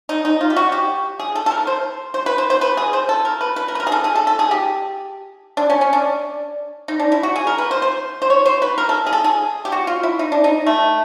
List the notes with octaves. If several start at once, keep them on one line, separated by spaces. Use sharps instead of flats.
D#4
D#4
F4
G4
F#4
G4
G#4
A4
A4
A#4
C5
C5
B4
C5
C5
B4
G#4
C5
A4
A#4
B4
B4
A#4
B4
A#4
G#4
A4
G#4
A4
A4
G#4
G4
D4
C#4
C#4
D4
D#4
D4
E4
F#4
G#4
A#4
B4
C5
C5
C5
C#5
C5
B4
A#4
A4
G#4
A4
G#4
G4
F#4
F4
E4
D#4
D4
D#4
A3